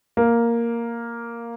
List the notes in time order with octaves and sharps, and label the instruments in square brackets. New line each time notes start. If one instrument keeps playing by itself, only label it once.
[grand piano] A#3